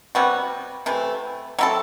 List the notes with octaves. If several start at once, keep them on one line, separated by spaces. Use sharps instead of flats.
C3 G3 B3 F#4
C3 E3 A3
F#3 C4 E4 A4